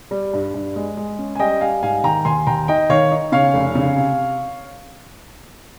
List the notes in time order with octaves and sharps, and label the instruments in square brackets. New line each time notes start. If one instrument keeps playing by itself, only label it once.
[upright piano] G3
G2
G2
G#3
G#3
C#4
G#5
G3 D#5 G5
G3 F5 G#5
G#2 F5 G#5
D#3 G5 A#5
D#2 G#5 C6
D#2 G5 A#5
D#4 D#5 G5
D#3 C#5 F5
D#4
C#3 C#5 F5
F1
C#3
C3